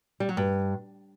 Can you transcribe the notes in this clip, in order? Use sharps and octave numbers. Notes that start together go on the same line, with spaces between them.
G3
F#3
G2